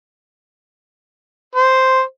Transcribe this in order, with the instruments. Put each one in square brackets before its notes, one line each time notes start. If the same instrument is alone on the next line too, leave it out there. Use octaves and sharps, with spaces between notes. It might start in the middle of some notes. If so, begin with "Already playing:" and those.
[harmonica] C5